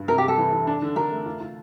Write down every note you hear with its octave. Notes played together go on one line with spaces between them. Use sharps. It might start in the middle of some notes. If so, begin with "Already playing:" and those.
Already playing: G2
C3 A#4
G4
G3 A4
E3
E3
D4
D3
D3 A#4
A3
F4
F4